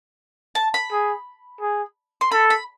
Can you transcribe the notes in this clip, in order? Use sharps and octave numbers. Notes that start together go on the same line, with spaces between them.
A5
B5
G#4
G#4
C6
A4 B5
B5